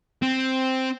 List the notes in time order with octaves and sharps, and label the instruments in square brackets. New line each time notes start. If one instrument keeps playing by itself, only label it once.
[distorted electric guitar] C4